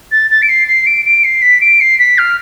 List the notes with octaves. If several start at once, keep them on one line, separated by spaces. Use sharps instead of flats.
A6
A6
D7
C7
C7
D7
D7
C7
B6
D7
C7
B6
F6